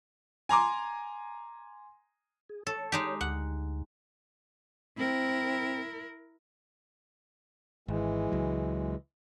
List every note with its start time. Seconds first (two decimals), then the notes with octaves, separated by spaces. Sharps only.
0.49 G#5 A#5 C6 D6
2.49 G#4
2.67 A4 C#5
2.92 G#3 D#4 G4
3.21 D2 F#5
4.98 C4 E4 A#4
7.88 G#1 E3 G#3
8.32 C#2 F#3